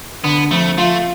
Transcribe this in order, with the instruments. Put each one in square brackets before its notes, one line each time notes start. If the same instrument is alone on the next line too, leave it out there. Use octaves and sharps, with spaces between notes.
[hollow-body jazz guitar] D3 [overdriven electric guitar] B3
[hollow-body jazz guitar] F2 [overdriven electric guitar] A3
[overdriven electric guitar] A3 [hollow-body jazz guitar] F4